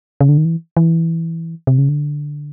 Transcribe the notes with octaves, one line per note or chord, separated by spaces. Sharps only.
C#3
D3
D#3
E3
E3
C3
C#3
D3